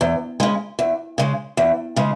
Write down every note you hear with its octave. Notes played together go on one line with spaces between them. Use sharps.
E2
C#3 G#3
E2
C#3 G#3
E2
C#3 G#3